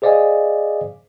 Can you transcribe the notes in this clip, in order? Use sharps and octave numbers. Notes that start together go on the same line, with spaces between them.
G#4 C5 D5 D#5 F5 G#5